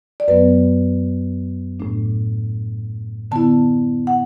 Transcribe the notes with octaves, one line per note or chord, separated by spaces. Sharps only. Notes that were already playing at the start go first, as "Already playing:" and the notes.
D5
F#2 F#3 B3 B4
A2 A3 D4
D3 B3 E4 A5
F#5